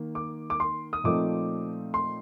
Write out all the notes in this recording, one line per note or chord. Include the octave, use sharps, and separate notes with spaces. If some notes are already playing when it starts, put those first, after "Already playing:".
Already playing: D#3 A#3
D6
D6
C6
D#6
A#2 F3 A3 C4 D#4 D6
C6